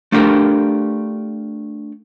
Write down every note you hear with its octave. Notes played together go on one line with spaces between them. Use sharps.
A3 D4 F4 G4 A#4